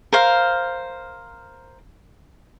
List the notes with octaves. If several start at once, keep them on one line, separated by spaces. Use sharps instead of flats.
A#4 C5 F5